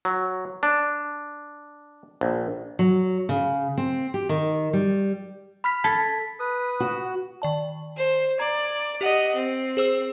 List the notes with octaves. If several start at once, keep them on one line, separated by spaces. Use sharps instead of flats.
F#3
D4
A#1
F#3
C#3
C4
G4
D#3
G3
B5 F6 B6
A4 A5 G#6 B6
B4 D#6
F#4
D#3 D5 A5
C5
D5 A#5 G#6
G4 D#5 F#5
C4
G#4 C5 E6